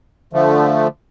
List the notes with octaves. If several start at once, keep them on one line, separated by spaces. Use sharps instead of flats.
D3 F3 A3